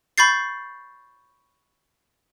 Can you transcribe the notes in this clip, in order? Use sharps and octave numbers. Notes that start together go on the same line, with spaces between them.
B5 C#6 G6 A6 C7